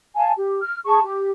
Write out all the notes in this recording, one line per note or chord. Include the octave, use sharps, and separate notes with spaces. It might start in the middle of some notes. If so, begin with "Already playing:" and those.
F5 G#5 A5
G4
F6
G#4 A5 C#6
G4